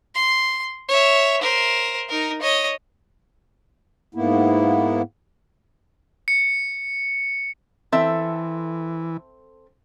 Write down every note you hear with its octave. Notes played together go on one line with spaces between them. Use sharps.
C6
C#5 E5
A#4 C5
D#4 A#4
C#5 D#5
G#2 A#3 B3 E4
C#7
E3 C4 A4 E5